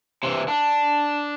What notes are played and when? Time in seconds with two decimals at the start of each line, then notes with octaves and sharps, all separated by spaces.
0.23 C3 E3
0.48 D4